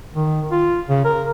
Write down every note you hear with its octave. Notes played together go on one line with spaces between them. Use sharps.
D#3
F4
C#3
A#4